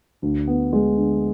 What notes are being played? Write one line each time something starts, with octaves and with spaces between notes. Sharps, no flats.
D2
B3
G#3
D3